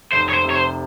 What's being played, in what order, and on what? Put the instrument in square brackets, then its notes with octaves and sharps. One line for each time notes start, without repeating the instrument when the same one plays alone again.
[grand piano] F1 [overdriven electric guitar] C5
[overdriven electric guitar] C#5
C5
[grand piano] C3
[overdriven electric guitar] C#5
C5